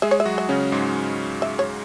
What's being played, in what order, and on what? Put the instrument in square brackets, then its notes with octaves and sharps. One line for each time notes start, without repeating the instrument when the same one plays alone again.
[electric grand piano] G#3 G#4 [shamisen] E5
[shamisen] C#5
E5
[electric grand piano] F#3 F#4
[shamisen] E5
[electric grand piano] C#3 C#4
G#2 G#3
[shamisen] E5
C#5